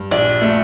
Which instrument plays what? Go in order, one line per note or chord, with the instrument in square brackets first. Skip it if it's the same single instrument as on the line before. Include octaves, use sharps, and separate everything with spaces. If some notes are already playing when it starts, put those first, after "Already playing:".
Already playing: [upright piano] G2
[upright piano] A#1 [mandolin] D4
[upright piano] A3